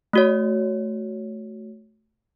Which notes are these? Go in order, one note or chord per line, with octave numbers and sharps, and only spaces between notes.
A3 F#4 C#5